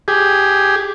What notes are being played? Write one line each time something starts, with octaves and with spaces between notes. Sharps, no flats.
G4 G#4